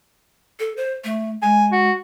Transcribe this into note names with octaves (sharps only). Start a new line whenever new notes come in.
A4
C5
A3
G#3 G#5
F#4